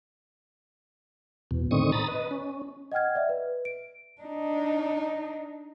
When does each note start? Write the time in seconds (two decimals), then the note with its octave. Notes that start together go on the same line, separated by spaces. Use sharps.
1.51 E2 B2
1.71 A2 D3 D#3 C4 C#6 D#6
1.92 A#5 B5 D#6 A6
2.08 B4 D#5
2.31 C#4
2.92 D#5 F#5 G5 F6 G#6
3.15 D5 E5
3.29 B4
3.65 D7
4.21 D4 D#4